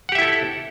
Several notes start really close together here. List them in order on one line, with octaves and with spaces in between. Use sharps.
F#5 G4 E5 E4 A4